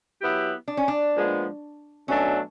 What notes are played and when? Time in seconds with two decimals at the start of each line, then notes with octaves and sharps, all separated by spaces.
0.21 F#3 B3 E4 G4
0.68 D4
0.77 C#4
0.88 D4
1.14 A#2 F3 G#3 B3
2.08 B2 F#3 A3 C#4 D4